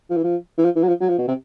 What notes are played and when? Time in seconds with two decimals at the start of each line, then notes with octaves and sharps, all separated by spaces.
0.10 F3
0.17 E3
0.24 F3
0.58 E3
0.65 F3
0.76 E3
0.83 F#3
0.88 F3
1.01 F#3
1.09 F3
1.18 B2
1.28 C3